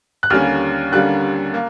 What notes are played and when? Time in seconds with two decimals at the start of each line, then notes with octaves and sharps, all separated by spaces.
0.23 F#6
0.30 D#2 D3 G3 A#3 C#4 F6
0.92 D#2 D3 G3 A#3 C#4 F#6
1.54 A#3